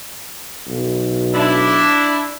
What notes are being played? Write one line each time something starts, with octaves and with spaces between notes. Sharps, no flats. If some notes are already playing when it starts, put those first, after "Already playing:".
B1
D4 E4